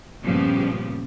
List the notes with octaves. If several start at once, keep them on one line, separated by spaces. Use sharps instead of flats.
G2 A#2 C#3 F3 B3 G4